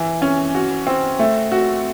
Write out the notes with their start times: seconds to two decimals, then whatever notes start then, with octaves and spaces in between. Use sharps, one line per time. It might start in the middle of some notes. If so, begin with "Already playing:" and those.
Already playing: E3
0.22 C#4
0.55 F#4
0.87 C4
1.19 A3
1.52 F#4